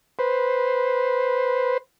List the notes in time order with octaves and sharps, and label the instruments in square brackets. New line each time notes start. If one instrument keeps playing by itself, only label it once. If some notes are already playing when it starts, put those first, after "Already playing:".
[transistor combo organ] B4 C5